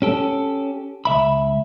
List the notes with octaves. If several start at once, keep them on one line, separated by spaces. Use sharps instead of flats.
C#4 G4 A4
C#2 E5 B5